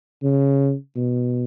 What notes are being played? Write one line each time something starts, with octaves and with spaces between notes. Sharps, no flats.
C#3
B2